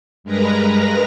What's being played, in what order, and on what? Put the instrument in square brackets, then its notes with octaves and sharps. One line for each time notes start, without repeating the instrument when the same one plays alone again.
[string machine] G2 G#3 A#4 B4 A#5 A#6